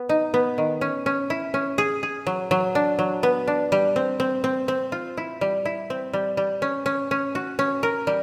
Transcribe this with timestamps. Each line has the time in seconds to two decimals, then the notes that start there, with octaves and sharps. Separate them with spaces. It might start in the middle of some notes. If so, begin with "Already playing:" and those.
Already playing: B3
0.09 D#4
0.34 B3
0.58 D#3
0.81 C#4
1.06 C#4
1.30 E4
1.54 C#4
1.78 G#4
2.03 G#4
2.26 F#3
2.51 F#3
2.75 D4
2.99 F#3
3.23 B3
3.47 D4
3.72 G3
3.96 C4
4.20 C4
4.44 C4
4.68 C4
4.92 F4
5.17 E4
5.41 G3
5.65 E4
5.90 C4
6.13 G3
6.37 G3
6.62 C#4
6.86 C#4
7.11 C#4
7.35 F#4
7.59 C#4
7.83 A#4
8.07 G3